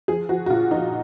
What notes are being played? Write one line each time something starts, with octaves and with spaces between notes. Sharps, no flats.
F3 G#4
F3 F#4
F#4
A#2 F4
F3 D#4